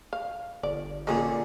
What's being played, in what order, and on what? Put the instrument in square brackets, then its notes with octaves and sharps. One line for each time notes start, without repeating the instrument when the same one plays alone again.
[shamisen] F5
[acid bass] G1 [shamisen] D5
[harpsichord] A#2 D3 [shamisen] G#3 C#4 G#4